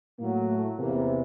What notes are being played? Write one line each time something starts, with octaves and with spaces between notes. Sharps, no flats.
A2 F#3 A#3
A3
E2 C3 E3 A#3